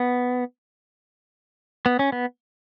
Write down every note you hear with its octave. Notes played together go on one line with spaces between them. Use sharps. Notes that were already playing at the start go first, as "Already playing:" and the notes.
Already playing: B3
B3
C#4
B3